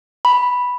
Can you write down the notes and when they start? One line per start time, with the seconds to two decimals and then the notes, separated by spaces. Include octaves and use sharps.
0.25 B5